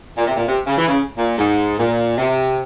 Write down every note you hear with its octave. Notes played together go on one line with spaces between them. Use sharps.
A#2
C3
A#2
C3
C#3
E3
C#3
A#2
G#2
A#2
C3